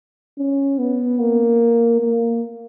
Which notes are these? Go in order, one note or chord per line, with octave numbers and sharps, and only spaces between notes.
C#4
B3
A#3
A#3